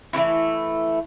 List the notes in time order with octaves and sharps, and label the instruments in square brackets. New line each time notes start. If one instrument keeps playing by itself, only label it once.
[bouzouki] E3 A3 C#4 E4